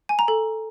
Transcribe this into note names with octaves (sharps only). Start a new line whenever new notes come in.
G#5
A#5
A4